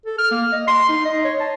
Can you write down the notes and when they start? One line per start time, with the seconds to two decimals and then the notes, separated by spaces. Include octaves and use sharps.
0.06 A4
0.18 F6
0.31 A#3
0.52 D#5
0.67 C6
0.89 D#4
1.05 D#5
1.24 C#5
1.40 A5